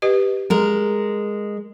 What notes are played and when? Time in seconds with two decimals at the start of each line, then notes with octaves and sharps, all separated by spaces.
0.02 G4 B4 D#5
0.50 G#3 A#4